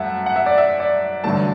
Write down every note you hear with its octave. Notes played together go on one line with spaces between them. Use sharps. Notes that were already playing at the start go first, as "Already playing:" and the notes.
Already playing: F#2 F#3 A3 E5 F#5 A5
F#5
E5
D5
E5
D5
A1 G2 D3 F#3 A3 A5